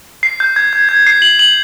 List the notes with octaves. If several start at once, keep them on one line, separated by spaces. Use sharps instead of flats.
C7
G6
G#6
G#6
G#6
C7
F#7
F#7